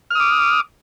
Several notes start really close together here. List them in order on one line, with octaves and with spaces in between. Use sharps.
F6 D#6 D6